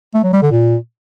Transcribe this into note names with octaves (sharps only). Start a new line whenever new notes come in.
A3
F#3
G3
D3
A#2